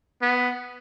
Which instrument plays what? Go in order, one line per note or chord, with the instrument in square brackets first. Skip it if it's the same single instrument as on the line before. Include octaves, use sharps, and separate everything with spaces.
[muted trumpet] B3